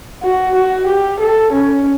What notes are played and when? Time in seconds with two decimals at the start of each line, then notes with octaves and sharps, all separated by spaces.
0.22 F#4
0.55 F#4
0.87 G4
1.20 A4
1.52 C#4